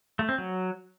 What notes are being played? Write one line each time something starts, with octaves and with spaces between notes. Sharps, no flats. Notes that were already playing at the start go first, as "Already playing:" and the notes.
A3
C4
F#3